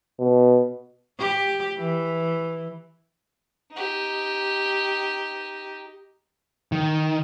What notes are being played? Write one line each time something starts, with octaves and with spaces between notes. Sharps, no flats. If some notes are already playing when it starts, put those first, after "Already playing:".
B2
G4
E3
D#4 G4
D#3